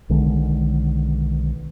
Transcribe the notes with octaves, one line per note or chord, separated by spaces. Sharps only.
B1 D3 D#3 G#3